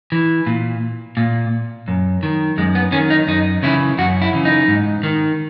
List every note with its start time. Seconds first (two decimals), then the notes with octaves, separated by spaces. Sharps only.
0.12 E3
0.47 A#2
1.17 A#2
1.88 F#2
2.23 D#3
2.58 F#2 G#3
2.75 B3
2.92 D#3 C#4
3.10 D#4
3.27 F#2 D#4
3.63 C#3 E3 E4
3.98 F#2 F#4
4.22 E4
4.33 C#3 E3
4.45 D#4
4.68 G#2
5.03 D#3